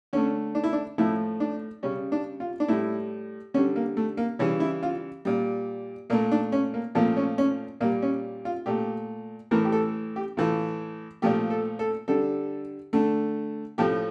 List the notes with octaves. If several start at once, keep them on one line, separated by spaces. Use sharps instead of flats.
D3 A3 C#4
D4
E4
D4
A2 F3 A3 E4
D4
C#3 G3 C#4
D4
F4
D4
A2 G3 E4
D3 G3 C#4
A#3
A3
A#3
C#3 E3 G3 C#4
E4
F4
A#2 G3
A#2 A3 A#3
D4
C#4
A#3
A#2 F3 A3 A#3
C#4
C#4
A#2 G3 A#3
C#4
F4
A#2 A3 G4
A2 E3 A3 A#4
G4
A4
G4
A2 E3 A3 F4
A#2 F3 A3 G4
A4
A4
D3 G3 A4
D3 A3
A2 F3 A3 G4